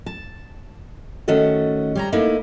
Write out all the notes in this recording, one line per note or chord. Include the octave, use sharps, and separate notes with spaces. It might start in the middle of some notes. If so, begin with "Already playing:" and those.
A5
D#3 A3 C#4 F#4 A4 D#5
G3 C#5 A#5
A3 A#3 D#4 E4